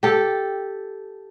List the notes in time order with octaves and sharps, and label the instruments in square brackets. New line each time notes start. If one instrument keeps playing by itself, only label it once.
[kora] G4 A4